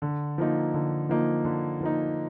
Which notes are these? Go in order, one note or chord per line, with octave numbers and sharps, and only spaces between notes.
D3
F3 A#3 D#4
D3
F3 A#3 D#4
D3
F3 A#3 D#4